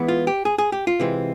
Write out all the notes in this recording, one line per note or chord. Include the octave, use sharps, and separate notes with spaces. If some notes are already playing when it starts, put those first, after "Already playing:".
Already playing: E3 G#3 B3 E4
F4
G4
G#4
G#4
G4
F4
C3 E3 G#3 C4